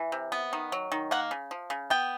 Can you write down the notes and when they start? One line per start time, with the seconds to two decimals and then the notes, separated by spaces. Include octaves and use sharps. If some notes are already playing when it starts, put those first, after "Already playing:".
Already playing: E3
0.12 C3
0.32 B3
0.53 D#3
0.72 F#3
0.92 D#3
1.11 A#3 F#5
1.31 C#3
1.51 F3
1.70 C#3
1.90 B3 G5